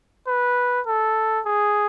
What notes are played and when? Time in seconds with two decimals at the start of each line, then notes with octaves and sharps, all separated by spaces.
0.27 B4
0.87 A4
1.46 G#4